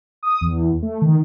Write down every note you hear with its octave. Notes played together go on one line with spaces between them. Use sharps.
D#6
E2
A3
D#3